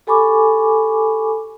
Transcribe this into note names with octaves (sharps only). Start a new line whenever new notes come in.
G4 A4 G#5 B5 C#6 D6